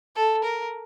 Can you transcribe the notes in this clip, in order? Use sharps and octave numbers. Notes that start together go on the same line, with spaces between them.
A4
A#4